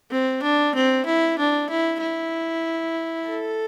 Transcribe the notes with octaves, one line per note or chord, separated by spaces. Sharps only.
C4
D4
C4
E4
D4
E4
E4
A4